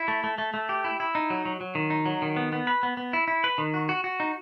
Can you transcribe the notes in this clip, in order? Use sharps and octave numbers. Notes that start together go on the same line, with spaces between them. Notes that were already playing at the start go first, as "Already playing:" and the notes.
Already playing: E4
A3
A3
A3
A3
G4
E4
E4
D#4
F#3
F#3
F#3
D#3
D#4
F#3
D#3
B3
B3
B4
B3
B3
E4
E4
B4
D#3
F#4
F#4
F#4
D#4